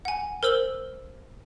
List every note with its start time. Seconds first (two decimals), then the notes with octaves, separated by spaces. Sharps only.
0.05 F#5 G#5
0.43 A#4 C5 E6 F#7 G7